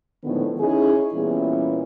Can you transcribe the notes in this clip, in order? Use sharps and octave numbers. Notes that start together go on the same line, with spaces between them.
A2 D3 D#3 F3 G#3 B3
C#4 D#4 E4 G#4
A#2 E3 G3 B3 C#4 E4